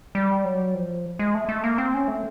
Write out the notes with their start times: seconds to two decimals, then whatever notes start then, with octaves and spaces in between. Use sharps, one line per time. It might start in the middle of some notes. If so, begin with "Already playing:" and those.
0.15 G3
0.44 F#3
0.75 F3
1.19 G#3
1.35 A3
1.49 A3
1.64 A#3
1.78 C4
1.94 C#4
2.08 A3